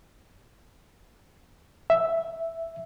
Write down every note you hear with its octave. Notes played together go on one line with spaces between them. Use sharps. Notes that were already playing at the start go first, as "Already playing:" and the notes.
E5